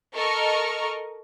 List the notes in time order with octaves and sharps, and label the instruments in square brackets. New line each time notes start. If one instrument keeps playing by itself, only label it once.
[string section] A4 A#4 D#5 C#6 F6